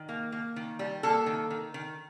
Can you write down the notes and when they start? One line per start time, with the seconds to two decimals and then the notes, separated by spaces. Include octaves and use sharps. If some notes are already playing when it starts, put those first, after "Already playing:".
Already playing: D#3
0.09 A#3
0.32 A#3
0.56 D#3
0.79 G3
1.03 A#3 A4
1.26 D#3
1.50 D#3
1.74 D#3